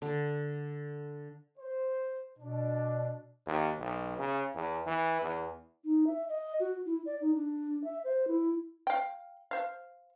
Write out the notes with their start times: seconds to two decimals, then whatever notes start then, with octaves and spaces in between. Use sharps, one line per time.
0.02 D3
1.58 C5
2.39 B2 D4
3.46 D#2
3.79 B1
4.18 C#3
4.54 E2
4.87 E3
5.22 E2
5.84 D#4
6.06 E5
6.28 D#5
6.59 F#4
6.85 E4
7.05 D5
7.20 D#4
7.34 D4
7.84 E5
8.04 C5
8.27 E4
8.87 F5 G5
9.51 C5 F5